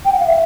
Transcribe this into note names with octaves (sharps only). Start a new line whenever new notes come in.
G5
F#5
F5
E5